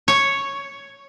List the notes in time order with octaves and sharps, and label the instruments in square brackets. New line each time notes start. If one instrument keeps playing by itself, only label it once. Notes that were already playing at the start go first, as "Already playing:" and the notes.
[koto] C#5